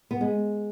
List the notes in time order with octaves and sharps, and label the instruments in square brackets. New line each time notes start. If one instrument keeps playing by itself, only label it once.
[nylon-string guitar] B3
G#3